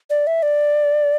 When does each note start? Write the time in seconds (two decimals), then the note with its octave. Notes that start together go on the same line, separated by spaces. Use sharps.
0.10 D5
0.27 E5
0.43 D5